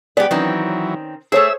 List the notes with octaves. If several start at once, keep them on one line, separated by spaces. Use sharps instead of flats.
G#3 B3 G4 B4 D5
D#3 E3 F#3 C4 C#4
A3 G#4 A4 C5 C#5 E5 E6